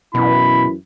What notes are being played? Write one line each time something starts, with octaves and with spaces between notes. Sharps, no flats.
F#2 B2 E3 E4 B5